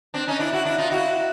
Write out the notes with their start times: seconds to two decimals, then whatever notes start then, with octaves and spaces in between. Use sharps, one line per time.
0.14 C4 D4
0.28 C#4 D#4
0.39 D4 E4
0.53 E4 F#4
0.65 D4 E4
0.78 D#4 F4
0.91 E4 F#4